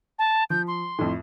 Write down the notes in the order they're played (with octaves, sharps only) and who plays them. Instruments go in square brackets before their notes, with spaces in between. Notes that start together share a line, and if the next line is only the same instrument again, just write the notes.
[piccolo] A5
[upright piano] F3 [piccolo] G6
[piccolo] C6
[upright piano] F2 A2